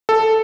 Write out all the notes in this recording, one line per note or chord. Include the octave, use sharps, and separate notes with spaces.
A4